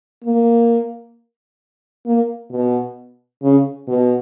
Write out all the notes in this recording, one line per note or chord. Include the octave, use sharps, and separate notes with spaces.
A#3
A#3
B2
C#3
B2